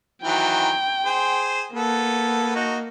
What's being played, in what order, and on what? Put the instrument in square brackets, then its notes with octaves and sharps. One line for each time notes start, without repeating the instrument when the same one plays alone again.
[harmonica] D#3 E3 F#3 [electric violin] G5
[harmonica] G#4 C5
[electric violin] A#3 [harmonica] B3 A4
[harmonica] D#4 F#4